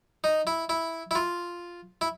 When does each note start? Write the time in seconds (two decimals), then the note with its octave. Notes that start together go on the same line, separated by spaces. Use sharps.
0.24 D#4
0.47 E4
0.69 E4
1.11 E4
1.15 F4
2.01 E4